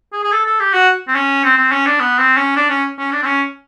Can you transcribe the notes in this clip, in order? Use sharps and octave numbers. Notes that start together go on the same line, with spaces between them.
G#4
G#4
A4
A4
G4
F#4
C4
C#4
C4
C4
C#4
D4
B3
C4
C#4
D4
C#4
C#4
D4
C4
C#4